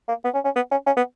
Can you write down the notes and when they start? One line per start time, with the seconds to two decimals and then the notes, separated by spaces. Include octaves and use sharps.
0.08 A#3
0.24 B3
0.34 C#4
0.45 C#4
0.56 B3
0.71 C#4
0.87 C#4
0.97 B3